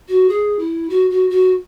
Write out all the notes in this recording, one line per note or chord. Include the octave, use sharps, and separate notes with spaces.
F#4
G#4
E4
F#4
F#4
F#4